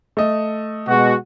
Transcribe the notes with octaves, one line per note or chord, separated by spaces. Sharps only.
A3 D#5
B2 G#3 F#4